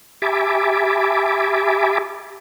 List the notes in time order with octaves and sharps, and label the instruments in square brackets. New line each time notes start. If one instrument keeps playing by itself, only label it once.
[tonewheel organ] G4 E5 G#5 A5 B5 D6